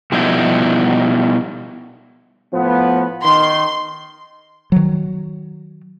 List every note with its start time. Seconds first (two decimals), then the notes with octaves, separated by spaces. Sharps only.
0.12 B2 F3 G3 D#4 E4
2.53 A2 F3 B3
3.24 D#3 C6
4.72 D#3 F#3